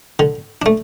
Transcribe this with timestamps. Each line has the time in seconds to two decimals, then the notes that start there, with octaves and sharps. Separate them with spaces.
0.19 D3
0.62 A3 D4